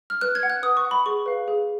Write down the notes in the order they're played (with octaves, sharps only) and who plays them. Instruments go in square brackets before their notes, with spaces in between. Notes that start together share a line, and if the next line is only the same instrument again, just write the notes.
[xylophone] F6
B4 F#6
G#6
F#5
F#6
B4 D#6
C#6
F#5
B5
G#4 C#6
B4 F5
G#4